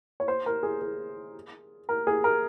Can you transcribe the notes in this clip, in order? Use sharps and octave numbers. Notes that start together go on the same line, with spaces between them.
C#5
C5
A#4
G#4
G#4
A#4
G#4
A#4